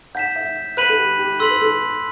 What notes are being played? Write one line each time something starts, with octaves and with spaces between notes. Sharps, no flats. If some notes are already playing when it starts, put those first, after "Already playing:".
F#5 G6 B6 E7
E5
B4 B5 F#6 B6 D#7 F#7
A4
G4
G4
A4 C6 E6 B6 F#7
B4
A4